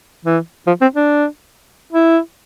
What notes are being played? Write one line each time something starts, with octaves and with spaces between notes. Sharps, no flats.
E3
F3
C4
D4
E4